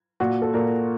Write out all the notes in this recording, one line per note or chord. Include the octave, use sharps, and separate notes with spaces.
A#2 F#4
A4
A#2 A#4